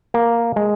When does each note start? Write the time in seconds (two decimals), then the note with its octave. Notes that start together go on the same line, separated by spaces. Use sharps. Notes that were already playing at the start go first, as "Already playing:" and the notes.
0.14 A#3
0.56 G#3